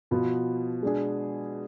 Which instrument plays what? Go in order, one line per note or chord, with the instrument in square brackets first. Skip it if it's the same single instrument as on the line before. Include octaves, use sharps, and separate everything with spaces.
[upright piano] B2 [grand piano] F3 B3 F4
[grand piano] G#3 D4 G#4